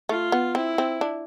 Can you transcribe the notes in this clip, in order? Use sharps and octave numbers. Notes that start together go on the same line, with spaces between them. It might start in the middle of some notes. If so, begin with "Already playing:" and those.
A3 F4
B3
C4 E4
C4
D4